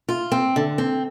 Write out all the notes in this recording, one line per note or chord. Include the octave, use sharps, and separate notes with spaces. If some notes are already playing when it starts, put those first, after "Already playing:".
F4
C4
D3
C4